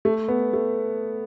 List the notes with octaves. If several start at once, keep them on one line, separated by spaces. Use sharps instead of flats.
A3
B3
A3